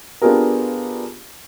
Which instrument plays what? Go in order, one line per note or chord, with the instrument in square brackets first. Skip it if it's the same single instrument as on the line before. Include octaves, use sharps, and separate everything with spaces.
[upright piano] B3 D4 F4 G4 G#4 A#4